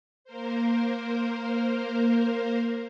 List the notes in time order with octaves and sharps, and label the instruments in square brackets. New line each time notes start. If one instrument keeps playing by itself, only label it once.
[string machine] A#3 A#4 C5